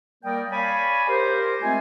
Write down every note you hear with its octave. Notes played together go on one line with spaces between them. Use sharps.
G3 A#3 A#4 D5 D#5 G5
C#5 D5 F5 G#5 B5
G4 A#4 C5
G#3 A3 C4 F4 G#5